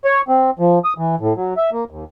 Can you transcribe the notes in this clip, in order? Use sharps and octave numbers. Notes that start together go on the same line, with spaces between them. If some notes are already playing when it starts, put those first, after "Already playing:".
C#5
C4
F3
D#6
E3
A2
F#3
E5
A#3
D#2